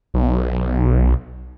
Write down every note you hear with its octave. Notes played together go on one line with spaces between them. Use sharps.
B1